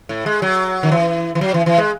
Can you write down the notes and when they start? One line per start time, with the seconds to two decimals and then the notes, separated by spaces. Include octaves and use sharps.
0.09 A2
0.26 G#3
0.42 F#3
0.83 D#3
0.92 E3
1.35 E3
1.41 F#3
1.54 E3
1.66 E3
1.78 G#3